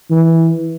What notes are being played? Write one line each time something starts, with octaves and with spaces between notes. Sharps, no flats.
E3